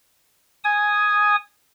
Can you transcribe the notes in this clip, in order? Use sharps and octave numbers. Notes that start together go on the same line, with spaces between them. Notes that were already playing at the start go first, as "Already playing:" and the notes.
G#5 D#6